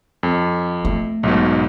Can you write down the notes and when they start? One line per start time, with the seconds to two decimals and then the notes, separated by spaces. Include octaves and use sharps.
0.23 F2
0.85 A3
1.23 B1 G#2 B2